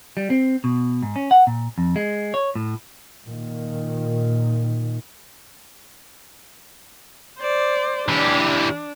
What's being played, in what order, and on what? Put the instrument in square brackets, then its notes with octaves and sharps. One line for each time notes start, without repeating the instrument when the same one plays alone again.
[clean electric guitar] G3
C4
B2
G#2
C#4
F#5
A#2
F2
G#3
C#5
A2
[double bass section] A#2 D#3
[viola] C5 D5
[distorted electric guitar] E3 G4 [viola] D4